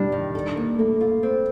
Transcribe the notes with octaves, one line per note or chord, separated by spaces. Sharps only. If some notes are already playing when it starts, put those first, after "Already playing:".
Already playing: G3 D4
D#3
A4
A#3
A3 A#3
F4
C4